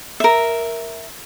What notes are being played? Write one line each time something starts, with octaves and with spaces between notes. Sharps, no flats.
A#4 E5